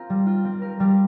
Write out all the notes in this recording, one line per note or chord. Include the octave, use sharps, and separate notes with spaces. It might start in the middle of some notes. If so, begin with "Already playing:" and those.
Already playing: C4 F4 A#4
G3
F4
C4
A#4
G3